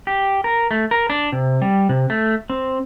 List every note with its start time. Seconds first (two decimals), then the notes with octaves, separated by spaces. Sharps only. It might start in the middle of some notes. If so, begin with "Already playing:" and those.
0.07 G4
0.44 A#4
0.71 A3
0.91 A#4
1.10 D4
1.32 C3
1.62 G3
1.89 C3
2.10 A3
2.50 C4